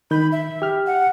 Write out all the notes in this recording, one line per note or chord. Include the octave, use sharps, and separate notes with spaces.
D#3 B5 G6
E5
G4 F6
F#5